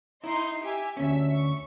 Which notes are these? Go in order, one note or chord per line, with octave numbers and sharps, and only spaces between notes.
D#4 E4 C6
G4 E5 G#5
D2 C#4 E5
C#6